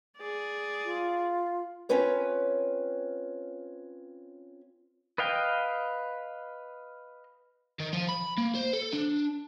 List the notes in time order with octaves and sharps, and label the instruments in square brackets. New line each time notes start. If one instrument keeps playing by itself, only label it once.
[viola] G#4 D5
[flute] F4
[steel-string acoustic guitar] C4 C#4 F4 B4 C#5
[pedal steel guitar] B4 D#5 F5 G5
[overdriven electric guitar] D#3
F3
B5
A#3
C5
A4
D4